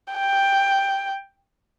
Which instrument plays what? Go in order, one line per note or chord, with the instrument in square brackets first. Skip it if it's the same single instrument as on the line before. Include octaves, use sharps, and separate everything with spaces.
[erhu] G5